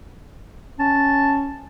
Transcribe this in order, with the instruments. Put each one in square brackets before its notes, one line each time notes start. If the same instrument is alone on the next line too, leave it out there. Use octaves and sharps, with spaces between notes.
[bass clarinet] C#4 [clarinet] A5